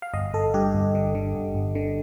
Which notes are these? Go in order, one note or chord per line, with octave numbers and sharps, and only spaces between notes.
F5
G1 D#5
G1 A4
G2 G4
G1
D3
D3
G1
G1
D3